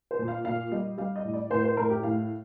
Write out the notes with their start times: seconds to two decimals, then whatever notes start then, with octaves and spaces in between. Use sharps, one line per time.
0.11 C5
0.19 A#2
0.28 F5
0.45 A#2 F5
0.72 G3 D#5
0.98 G3 F5
1.16 D#5
1.25 A2
1.34 D5
1.51 A2 C5
1.64 C5
1.77 A2 A#4
1.90 G4
2.03 A2 F5